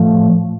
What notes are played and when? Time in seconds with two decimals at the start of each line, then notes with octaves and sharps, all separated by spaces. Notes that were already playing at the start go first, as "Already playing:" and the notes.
Already playing: A2 F3 A3